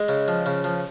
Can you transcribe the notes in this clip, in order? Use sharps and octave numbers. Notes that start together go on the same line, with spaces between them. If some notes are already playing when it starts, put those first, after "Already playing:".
Already playing: G#3
C#3
F3
C#3
F3